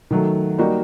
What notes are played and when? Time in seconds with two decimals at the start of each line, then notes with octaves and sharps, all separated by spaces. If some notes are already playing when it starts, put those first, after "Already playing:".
0.11 D#3 F#3 A3
0.58 G3 A#3 D#4 F#4